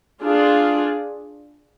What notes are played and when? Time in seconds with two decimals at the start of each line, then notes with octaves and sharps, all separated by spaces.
0.23 D4 F4 G#4